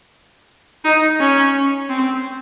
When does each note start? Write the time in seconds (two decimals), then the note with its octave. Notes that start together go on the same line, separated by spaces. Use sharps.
0.85 D#4
1.20 C#4
1.89 C4